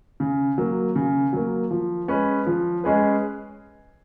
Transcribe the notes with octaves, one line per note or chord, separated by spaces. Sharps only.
C#3
F#3 A#3
C#3
F#3 A#3
F3
G#3 C#4 G#4 B4
F3
G#3 C#4 G#4 B4